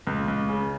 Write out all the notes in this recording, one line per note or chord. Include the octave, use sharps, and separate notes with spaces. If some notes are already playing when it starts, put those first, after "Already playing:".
C#2
C#2
C#3